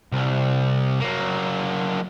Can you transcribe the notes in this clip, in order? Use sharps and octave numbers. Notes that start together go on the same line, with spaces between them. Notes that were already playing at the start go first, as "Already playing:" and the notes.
C2
F#3 A#3